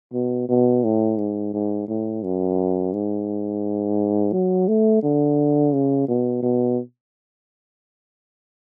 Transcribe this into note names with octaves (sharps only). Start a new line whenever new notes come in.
B2
B2
A2
G#2
G#2
A2
F#2
G#2
F#3
A3
D3
C#3
B2
B2